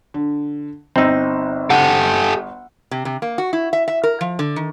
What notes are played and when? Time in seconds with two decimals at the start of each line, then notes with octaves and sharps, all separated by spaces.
0.14 D3
0.96 G1 C4 D#4 E6
1.70 G4 A4 F#5
2.91 C3
3.05 C3
3.22 A#3
3.38 F#4
3.53 E4
3.73 E5
3.88 E5
4.04 A#4
4.21 F3
4.39 D3
4.56 D#3